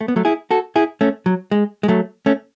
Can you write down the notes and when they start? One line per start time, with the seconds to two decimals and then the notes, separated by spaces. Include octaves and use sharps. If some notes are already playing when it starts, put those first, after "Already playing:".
0.01 A3
0.08 B3
0.16 F#3 A3
0.25 E4 G#4
0.51 F#4 A4
0.76 E4 G#4
1.01 A3 C#4
1.26 F#3
1.51 G#3
1.83 G#3
1.88 F#3 A3
2.26 A3 C#4